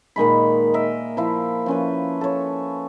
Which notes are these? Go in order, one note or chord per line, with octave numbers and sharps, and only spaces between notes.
A#2 D#3 G#3 B5
A#4 D#5 E5
F3 E4 F5
F3 C#4 B4
A4 C#5